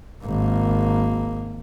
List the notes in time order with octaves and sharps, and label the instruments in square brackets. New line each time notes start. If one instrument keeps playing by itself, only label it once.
[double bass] G#1 A#3